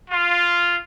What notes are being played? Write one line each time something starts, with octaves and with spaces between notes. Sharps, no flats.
F4